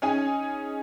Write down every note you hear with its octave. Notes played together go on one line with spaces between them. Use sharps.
C#4 D#4 G#4 G#5